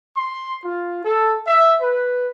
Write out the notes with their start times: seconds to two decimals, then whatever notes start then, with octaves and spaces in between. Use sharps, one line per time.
0.16 C6
0.65 F4
1.04 A4
1.46 E5
1.81 B4